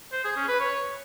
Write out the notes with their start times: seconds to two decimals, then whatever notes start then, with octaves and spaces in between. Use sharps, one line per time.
0.12 C5
0.24 G#4
0.36 C#4
0.48 B4
0.60 C#5